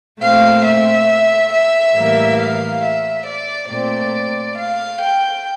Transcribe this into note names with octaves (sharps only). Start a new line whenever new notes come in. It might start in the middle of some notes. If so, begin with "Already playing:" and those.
A#2 A3 C4 F5
E5
E5
A2 E3 G3 A#3
F5
E5
D5
A#2 A3 C4 D5
F5
G5